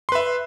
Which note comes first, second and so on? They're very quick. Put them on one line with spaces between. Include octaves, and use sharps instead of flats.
C6 B4 E5